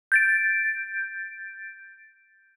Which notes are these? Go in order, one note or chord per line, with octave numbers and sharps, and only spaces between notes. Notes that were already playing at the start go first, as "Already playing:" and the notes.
G6 A6 D7